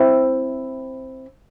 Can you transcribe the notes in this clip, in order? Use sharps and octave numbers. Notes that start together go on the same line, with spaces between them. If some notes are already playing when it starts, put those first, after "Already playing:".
Already playing: C4 E4